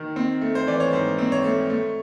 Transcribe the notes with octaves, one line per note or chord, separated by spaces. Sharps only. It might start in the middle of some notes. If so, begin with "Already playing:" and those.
Already playing: D#3
C4
A3
C5
E3 D5
C#5
G#2 C5
C4
C#5
A3
A3